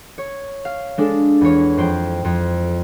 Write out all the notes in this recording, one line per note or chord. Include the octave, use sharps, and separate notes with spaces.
C#5
F5
G#3 D4 A4
E2 C#5
F2 C5 G5
F2